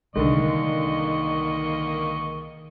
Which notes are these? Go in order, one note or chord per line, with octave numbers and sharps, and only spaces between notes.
C2 D3 D#3 G#3 A#3 D#5 C#6